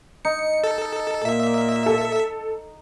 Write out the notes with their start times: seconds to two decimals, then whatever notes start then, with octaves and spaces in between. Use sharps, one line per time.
0.25 D#4 C#7
0.64 A4
1.25 A#2 A#3 E5
1.86 A4